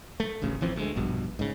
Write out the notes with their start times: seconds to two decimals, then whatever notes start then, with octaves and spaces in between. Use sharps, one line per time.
0.20 A3
0.41 D#1 A1 C#3
0.61 A1 E3 F3 C4
0.76 D2 G#3
0.96 A#1 G2 B2
1.39 G#2 C#3